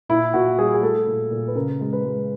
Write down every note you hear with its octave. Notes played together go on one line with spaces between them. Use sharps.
A#2 E4
A#2 F#4
G3 G#4
G#4
A3 A4
A#2
A#2
B4
C#3 A#4
G#3
B4
G#3